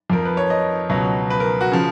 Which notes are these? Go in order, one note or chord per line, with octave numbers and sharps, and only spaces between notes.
F2 F3 A#4
B4
C#5
D#5
C#2 B2 F#3
B4
A#4
F#4
C#3 F3